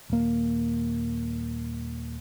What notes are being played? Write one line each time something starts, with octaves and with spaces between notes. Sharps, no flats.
D#1 A#3